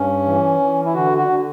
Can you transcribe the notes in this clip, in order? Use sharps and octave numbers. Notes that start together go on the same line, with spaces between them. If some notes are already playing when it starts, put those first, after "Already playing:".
Already playing: G2 C#4
E3
E3
E4
D3 F#4
F#4
D3